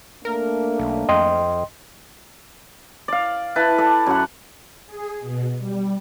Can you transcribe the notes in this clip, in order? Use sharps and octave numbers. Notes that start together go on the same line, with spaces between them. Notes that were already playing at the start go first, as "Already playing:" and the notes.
A3 A#3 D4 A#4
B1
F2 D#5 G5 C6
D5 F5
E4 B4 A5
A4 D5
F#2 F#5
G#4
B2
G3